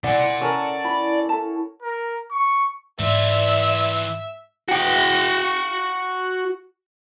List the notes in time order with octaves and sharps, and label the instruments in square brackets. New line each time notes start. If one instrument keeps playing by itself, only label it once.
[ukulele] E4 G#5 [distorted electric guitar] D5 C6 [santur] F#5
[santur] C#4 A4 A#4
[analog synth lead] E4 [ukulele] B5
[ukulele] A4 E5 A5
[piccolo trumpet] A#4
C#6
[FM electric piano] G#2 [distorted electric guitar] E3 F4 [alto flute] D5 [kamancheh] E5
[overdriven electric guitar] F#4 G5